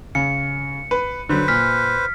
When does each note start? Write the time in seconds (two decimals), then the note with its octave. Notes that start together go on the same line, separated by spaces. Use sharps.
0.15 C#3 C#7
0.91 B4
1.29 D3 F#3 B4 C5
1.48 A#2 F6 B6